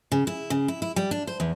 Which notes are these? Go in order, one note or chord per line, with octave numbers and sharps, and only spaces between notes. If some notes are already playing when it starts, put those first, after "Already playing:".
C#3
E4
C#3
E4
E4
G3
D4
C5
E2